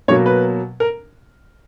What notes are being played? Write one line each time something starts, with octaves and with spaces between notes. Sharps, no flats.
B2 F#3 A#3 C#5
B4
A#4